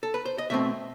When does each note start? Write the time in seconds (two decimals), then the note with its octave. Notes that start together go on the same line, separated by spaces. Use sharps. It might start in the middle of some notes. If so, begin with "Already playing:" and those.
0.03 A4
0.14 B4
0.26 C5
0.38 D#5
0.50 B2 A3 C4 E5